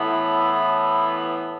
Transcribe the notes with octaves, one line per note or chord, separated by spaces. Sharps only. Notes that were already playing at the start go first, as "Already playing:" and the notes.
Already playing: A2 E3 B3